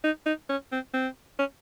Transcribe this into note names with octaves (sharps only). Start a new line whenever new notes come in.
D#4
D#4
C#4
C4
C4
C#4